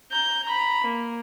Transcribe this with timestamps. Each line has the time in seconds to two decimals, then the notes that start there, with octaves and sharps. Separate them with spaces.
0.11 A#5 G6
0.44 A#5 B5
0.84 A#3